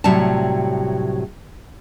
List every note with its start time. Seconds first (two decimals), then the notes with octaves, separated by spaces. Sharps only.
0.04 A2 C3 F#3 G3 A5